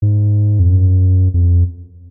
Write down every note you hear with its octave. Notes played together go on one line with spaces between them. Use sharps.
G#2
F2
F#2
F2